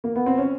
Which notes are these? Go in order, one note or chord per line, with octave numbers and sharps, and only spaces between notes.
A#3
B3
C4
C#4